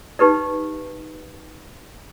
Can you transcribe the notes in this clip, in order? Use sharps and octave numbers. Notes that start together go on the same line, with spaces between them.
D#4 G4 B4 D5